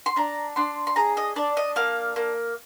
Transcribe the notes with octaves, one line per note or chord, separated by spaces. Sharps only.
C6
D4 A#5
D4 C6
C6
G#4 A#5
D#5
D4 D5
D#5
A#3 F5
A#3